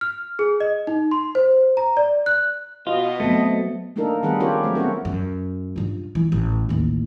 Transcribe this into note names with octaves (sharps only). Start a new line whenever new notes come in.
F6
G#4
D#5
D#4
C6
C5
A#5
D5
F#6
B2 F4 D#5
F#3 A3 B3 C4
A3 A#3 D4 D#4 A4 A#4
D#3 G3 B3 G#4 B4 F#5
C#4 F4 G4 A4 A#4 C#5
F#3 A3 C4 C5
B3 C#4 F#4 A#4
F#2
G2 F4
E3
A1
A1 D#2